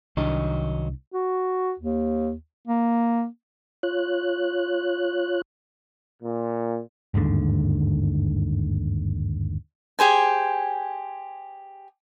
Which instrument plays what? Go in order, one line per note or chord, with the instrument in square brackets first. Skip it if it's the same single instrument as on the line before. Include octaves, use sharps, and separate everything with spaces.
[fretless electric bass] C2 D4 [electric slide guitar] D#3 F#3 D#5
[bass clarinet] F#4
D#2
A#3
[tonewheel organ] F4 C#5 F#6
[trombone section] A#2
[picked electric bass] G1 D#2 G#2 D3
[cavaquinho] G4 G#4 C5 G#5